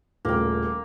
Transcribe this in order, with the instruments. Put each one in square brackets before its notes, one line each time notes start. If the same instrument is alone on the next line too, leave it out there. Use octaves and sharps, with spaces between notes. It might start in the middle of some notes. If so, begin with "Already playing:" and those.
[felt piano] D#1 A1 C#3 [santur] A#3 G5